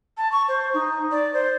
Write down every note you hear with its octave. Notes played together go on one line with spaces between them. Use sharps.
A5
C#6
C5
D#4
D5
C5